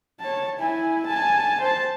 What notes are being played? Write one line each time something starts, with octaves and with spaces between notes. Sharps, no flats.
C#5 A5
E4 G#5
G#5 A5
C5 A5